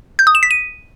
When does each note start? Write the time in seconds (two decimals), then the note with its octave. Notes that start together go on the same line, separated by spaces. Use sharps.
0.19 G6
0.27 D#6
0.35 E7
0.43 B6
0.51 D#7